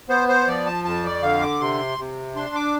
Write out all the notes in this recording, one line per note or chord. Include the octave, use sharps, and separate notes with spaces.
B3 C5
C5
F3 D5
A5
F2 A5
D5
D3 F5
D6
C3 C6
C3
D4 C6
D6